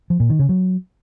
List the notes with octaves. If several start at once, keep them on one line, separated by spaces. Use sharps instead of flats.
F3
A#2
D#3
C#3
F#3